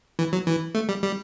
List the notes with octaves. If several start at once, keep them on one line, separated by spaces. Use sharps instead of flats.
E3
F#3
E3
A3
G3
G3